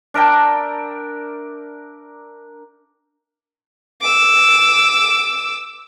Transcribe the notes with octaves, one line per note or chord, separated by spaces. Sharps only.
D4 A#4 E5 G5
D6 E6